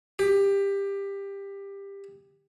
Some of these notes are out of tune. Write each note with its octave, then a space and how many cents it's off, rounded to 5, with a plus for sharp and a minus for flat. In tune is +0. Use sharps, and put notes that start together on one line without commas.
G4 +20